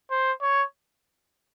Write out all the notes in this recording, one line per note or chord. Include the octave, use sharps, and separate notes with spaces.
C5
C#5